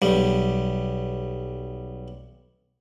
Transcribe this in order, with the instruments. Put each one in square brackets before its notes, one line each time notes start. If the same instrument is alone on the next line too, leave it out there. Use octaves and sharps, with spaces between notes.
[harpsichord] B1 G3